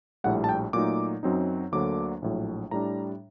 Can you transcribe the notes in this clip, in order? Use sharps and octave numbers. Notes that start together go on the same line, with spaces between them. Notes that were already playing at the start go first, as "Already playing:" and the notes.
A#1 A2 G3 F#5
A5
G5
A#2 F#3 A3 D#4 D6
F#2 F#3 C4 D#4
D2 D3 F#3 A#3 D4 D6
A#1 A2 F#3
A2 G3 D4 A#5